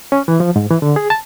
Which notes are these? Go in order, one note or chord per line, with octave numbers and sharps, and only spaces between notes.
C#4
E3
F3
G#2
E3
D3
G#4
A5